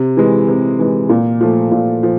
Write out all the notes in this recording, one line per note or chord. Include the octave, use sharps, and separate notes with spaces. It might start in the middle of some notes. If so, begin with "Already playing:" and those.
Already playing: C3
E3 G#3
C3
E3 G#3
A#2
F3 A3
A#2
F3